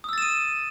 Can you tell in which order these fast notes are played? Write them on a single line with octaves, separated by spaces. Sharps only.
D#6 E6 A6 E7 D#7